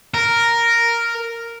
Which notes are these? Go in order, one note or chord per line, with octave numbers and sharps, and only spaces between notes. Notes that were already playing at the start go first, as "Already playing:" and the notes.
A#4